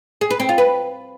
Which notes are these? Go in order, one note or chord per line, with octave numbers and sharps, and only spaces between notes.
G#4
B4
C4
F4
B4